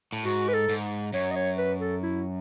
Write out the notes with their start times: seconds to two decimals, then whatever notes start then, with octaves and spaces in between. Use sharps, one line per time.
0.12 A2
0.24 G#2 F#4
0.48 B4
0.53 A4
0.69 G#2
1.13 F#2 C#5
1.31 D#5
1.36 C#5
1.57 B4
1.81 A4
2.03 E4